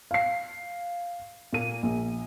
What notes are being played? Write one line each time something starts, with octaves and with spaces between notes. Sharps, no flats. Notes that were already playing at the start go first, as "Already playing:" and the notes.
F5 C7
A#2 A#3 D#7
A#1